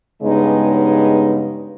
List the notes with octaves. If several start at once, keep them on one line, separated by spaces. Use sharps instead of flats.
G2 C#3 G#3 B3 D#4